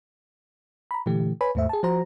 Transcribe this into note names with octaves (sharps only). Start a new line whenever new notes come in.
A#5 B5
A#2 D3 E3 A3 G4
B4 C#5 G#5 B5
D#2 G#2 A3 C5 E5
G#4 A5
F3 F#4 C5 A#5